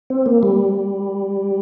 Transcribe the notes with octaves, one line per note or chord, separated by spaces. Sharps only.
C4
A#3
G3